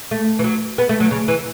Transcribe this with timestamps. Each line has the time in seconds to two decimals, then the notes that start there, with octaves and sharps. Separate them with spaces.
0.11 A3
0.39 E3
0.44 F#3
0.78 B3
0.89 A3
1.00 F#3
1.11 C#3
1.28 E3